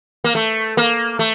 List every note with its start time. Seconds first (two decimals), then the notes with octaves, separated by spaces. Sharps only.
0.24 A#3
0.35 A3
0.77 A#3
1.19 A3